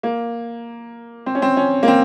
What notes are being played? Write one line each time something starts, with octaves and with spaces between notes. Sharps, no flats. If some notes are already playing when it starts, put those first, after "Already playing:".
A#3
C4
C#4
C4
C#4
A#3
C4